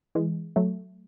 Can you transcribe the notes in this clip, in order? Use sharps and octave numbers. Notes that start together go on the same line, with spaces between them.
E3 G#3
F#3 A3